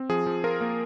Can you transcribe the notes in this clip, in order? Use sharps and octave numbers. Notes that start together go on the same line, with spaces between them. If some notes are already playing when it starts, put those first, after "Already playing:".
Already playing: C4
F3 G#4
F3
F4 A#4
A#3